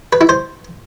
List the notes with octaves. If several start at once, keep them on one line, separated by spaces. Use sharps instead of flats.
B4
E4
C5